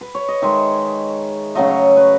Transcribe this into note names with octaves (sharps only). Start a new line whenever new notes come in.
B4
C#5
D#5
D#3 G#3 E5
C#3 F#3 A3 D#5
C#5
B4